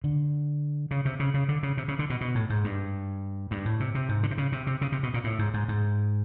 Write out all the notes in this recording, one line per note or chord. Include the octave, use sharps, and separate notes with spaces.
D3
C#3
C3
C#3
C#3
D3
C#3
C3
C#3
D3
B2
B2
A2
G#2
G2
G2
A2
C3
C3
G#2
D3
C3
C#3
C3
C3
C#3
C3
B2
A#2
A2
G#2
G#2
G#2